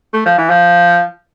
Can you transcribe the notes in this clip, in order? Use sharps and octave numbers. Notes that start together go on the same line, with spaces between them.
A3
F3
E3
F3